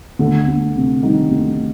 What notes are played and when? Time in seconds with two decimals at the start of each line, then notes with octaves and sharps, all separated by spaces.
0.19 D2 D3
0.47 D2
0.75 C3
1.03 D#3 G3
1.31 D2